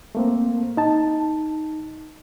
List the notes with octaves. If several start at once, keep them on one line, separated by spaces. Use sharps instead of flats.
A3 A#3 C4
D#4 A5